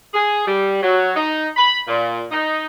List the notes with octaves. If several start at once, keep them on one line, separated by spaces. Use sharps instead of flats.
G#4
G3
F#3
D#4
B5
A#2
D#4